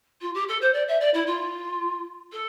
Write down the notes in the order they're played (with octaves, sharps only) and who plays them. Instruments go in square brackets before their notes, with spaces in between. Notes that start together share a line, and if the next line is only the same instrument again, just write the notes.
[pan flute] F4
G4
A4
C5
D5
E5
D5
E4
F4
A4